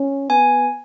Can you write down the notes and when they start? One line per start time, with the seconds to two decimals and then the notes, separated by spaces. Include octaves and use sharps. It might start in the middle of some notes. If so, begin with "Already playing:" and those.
Already playing: C#4
0.30 B3 G#5